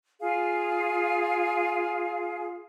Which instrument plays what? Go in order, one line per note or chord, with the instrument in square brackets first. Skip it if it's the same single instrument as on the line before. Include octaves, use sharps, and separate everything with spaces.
[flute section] F4 G#4 F5